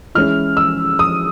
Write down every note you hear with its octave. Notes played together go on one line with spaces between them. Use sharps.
E3 G#3 C#4 E4 F6
E6
D#6